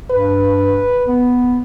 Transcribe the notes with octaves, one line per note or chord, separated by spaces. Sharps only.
G2 B4
B3